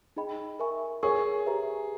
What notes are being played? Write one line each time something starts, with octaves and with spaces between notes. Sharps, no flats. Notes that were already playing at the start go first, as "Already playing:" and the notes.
D#4 G#4 D#5 G5 B5
A#4 E5 G#5 C#6
G#4 A#4 C#5 G#5 C#6
G4 B4 E5 A#5